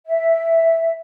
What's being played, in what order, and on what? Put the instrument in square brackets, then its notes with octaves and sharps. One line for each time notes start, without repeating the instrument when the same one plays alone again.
[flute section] E5